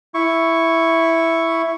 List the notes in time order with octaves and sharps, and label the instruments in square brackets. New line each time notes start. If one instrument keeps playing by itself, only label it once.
[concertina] E4 C#6